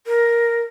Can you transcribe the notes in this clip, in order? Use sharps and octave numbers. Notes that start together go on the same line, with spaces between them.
A#4